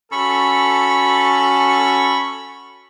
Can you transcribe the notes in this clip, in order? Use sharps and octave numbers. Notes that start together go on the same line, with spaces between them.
C#4 F#4 A4 B5 C#6